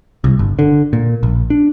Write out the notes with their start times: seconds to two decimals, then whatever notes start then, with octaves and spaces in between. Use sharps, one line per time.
0.24 C2
0.39 G1
0.59 D3
0.93 A#2
1.23 A#1
1.50 D4